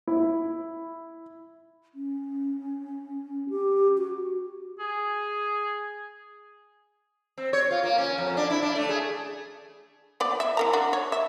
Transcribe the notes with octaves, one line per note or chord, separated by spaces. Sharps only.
E4
C#4
G4
F#4
G#4
C4
C#5
F4
A#3
C#4
F2
D4
E4
D4
A3
G#4
F3 B3 D5
E5
E3 A#4 A#5
D4 F#4
C#5
E5